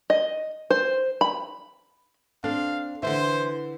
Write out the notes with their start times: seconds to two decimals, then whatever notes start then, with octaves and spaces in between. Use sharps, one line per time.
0.10 D#5
0.70 C5
1.21 B5
2.44 C4 D4 A4 F5
3.03 D3 E3 C5 E5